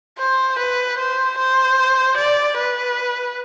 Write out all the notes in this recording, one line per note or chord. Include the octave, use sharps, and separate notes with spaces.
C5
B4
C5
C5
D5
B4